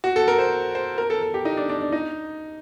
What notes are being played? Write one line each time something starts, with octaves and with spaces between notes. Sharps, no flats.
F#4
A4
A#4
C5
C5
A#4
A4
A4
G4
D#4
D4
D4
D4
D#4